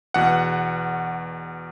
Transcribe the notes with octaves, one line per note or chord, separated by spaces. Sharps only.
E2 B2 F#5